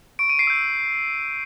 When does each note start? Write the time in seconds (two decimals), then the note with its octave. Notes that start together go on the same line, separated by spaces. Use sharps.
0.19 C#6 D7
0.29 D#7
0.39 C7 D7
0.47 E6 G6